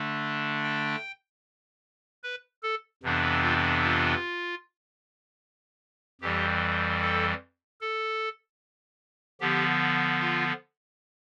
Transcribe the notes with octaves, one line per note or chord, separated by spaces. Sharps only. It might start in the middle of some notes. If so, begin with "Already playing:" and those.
Already playing: D3 A3 D4
G5
B4
A4
F2 C3 E3 B3 D4
F4
F4
F2 E3 G3 G4
A4
A4
D3 F3 B3 G4
F4